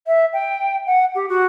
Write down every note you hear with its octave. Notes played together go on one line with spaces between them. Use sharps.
E5
G5
F#5
G4
F#4